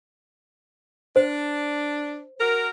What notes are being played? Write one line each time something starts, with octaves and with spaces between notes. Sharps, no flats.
D4 C5
F#4 A#4